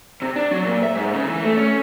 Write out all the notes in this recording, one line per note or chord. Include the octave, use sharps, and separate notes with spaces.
C3
D4
F#3
A#2
E5
G#2
C#3
E3
A3
C#4